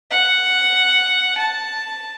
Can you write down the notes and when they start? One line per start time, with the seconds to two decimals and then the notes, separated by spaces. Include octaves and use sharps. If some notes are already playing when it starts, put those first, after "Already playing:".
0.11 F#5
1.37 A5